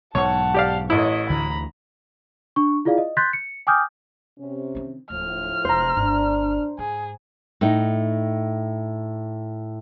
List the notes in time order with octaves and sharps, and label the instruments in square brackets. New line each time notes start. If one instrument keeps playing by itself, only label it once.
[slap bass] B1 G#2 [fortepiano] C#5 C#6 [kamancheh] F#5 A5
[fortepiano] G4 D5 F5
[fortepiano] A1 E4 [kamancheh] C#5 D#5
[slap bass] D2 D3 E3 [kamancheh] A#5 B5
[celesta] D4 C#6
E4 F4 G#4 D5 F5
D#5
C6 F#6 G6 A6 B6
C#7
G5 G#5 D6 D#6 F6 G6
[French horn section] C3 C#4
[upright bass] D#3 C4
[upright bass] D1 [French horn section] A2 F3 [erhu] F6
[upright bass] E1 [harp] C5 A#5
[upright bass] G1 [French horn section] D4
[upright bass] G#2 [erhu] G#4
[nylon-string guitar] A2 D#4